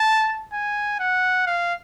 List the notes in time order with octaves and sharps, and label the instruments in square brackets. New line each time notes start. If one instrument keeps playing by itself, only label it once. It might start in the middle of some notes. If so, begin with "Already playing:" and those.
Already playing: [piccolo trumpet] A5
G#5
F#5
F5